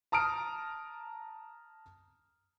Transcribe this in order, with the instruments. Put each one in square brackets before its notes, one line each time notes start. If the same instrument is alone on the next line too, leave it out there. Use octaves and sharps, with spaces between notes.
[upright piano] A5 A#5 D#6 F6 D7